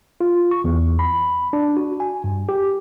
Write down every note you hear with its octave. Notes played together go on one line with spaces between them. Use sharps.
F4
C#6
E2
B5
D4
F#4
G#5
G2
G4